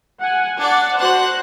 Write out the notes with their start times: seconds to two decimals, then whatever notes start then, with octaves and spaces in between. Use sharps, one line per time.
0.20 F#5 G#5
0.57 D4 D5 F#5
0.98 F#4 C5 F#5 F#6